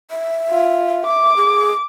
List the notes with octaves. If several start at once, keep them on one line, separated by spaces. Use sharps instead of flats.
E5
F4
D6
G#4